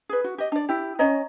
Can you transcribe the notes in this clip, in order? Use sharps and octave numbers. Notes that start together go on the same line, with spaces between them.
G#4 B4
F#4
G4 D#5
D4 D5
E4 G4
C#4 C#5 D#5 A#5